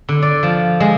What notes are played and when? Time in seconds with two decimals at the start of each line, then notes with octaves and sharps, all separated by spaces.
0.09 D3
0.22 D5
0.43 F3
0.80 G#3